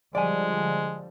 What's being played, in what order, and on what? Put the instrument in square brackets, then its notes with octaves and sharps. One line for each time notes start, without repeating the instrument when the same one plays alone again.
[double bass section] D3 F3 G3 [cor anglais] G#3 [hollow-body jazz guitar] D5 G#5